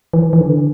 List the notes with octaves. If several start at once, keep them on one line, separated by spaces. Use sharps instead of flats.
E3
E3
D3